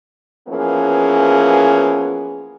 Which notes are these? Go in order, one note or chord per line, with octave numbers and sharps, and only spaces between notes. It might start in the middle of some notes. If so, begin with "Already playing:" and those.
E3 F3 A#3 B3 C#4 G#4